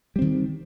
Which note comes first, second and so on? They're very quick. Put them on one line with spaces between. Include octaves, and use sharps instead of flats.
G3 C4 D#3